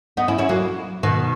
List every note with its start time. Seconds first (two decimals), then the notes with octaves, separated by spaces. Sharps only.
0.17 B3 D#4
0.28 C#4 E4
0.38 C#4 E4
0.49 F#3 A#3
1.03 B2 D#3